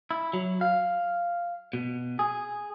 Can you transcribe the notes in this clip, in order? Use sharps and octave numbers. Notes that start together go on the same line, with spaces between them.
E4
F#3
F5
B2
G#4